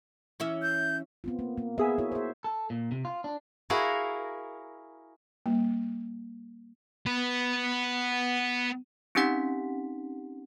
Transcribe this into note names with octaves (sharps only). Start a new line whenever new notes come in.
E3 C#4 E5
G6
B3 C4 F4
A#3
A#3
B3 G#4 A#4 E5 G#5
E4 F#4 C#5
C5 E5
A4
A#2
C3
F4
D4
E4 F#4 G#4 A#4 F5
G3 A#3
B3 B4
C4 C#4 D#4 G4 F#5 B6